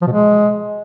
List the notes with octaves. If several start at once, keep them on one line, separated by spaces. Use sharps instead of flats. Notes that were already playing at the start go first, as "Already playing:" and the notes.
F3
B2
G#3